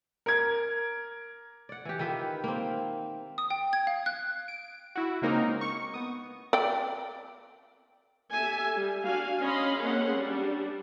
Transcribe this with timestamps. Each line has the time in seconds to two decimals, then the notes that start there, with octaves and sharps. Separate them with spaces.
0.26 A#4 G#6
1.69 D5 F#5
1.85 E3 G4
1.99 D#3 F4 B4 E5
2.44 A#3 C4
3.38 D#6
3.50 G5
3.73 G#6
3.87 F5
4.06 F#6
4.48 D7
4.95 E4 F#4
5.22 C#3 G#3 A#3 C4 D#4 A#4
5.61 C#6
5.94 B3 D#6
6.53 D5 G5
8.33 G4 A4 E5 G#5
8.75 G3
9.05 D4 F#4 F5 G#5
9.43 C#4 D#5 F5 B5 C6
9.80 A#3 C4 C#4 G#4 F#5 C6
10.16 G3 D4